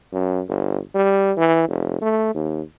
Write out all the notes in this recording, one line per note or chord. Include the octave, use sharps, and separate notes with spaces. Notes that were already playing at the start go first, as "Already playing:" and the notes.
F#2
G1
G3
E3
F1
A3
D#2